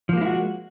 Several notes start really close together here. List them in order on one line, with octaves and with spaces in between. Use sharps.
F3 A#3 G#3 E4 F#4